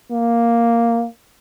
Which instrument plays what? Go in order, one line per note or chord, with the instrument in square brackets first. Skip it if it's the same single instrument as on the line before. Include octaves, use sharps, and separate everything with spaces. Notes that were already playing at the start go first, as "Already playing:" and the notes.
[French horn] A#3